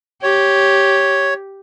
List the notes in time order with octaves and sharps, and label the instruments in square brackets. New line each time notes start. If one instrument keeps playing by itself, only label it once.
[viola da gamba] G4 [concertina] C#5